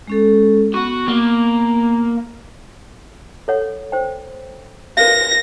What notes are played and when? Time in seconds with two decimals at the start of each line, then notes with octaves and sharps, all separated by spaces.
0.07 G#3 C#4 A4
0.74 B3 F#4
1.08 A#3
3.48 A4 C#5 F#5
3.92 C5 G5
4.97 A#4 B4 F5 A#6